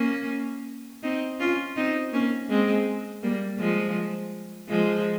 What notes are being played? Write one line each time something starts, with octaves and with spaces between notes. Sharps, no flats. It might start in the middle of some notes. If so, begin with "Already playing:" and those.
Already playing: A#3 C#4
C4 D#4
C#4 F4
C4 D#4
A#3 C#4
G#3 C4
G3 A#3
F3 G#3
F3 G#3